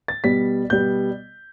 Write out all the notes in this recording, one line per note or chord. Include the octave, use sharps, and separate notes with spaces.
A6
B2 G3 B3 B6
B2 G3 B3 G6